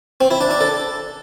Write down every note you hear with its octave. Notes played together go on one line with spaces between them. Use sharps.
C4
E4
D4
D4
A4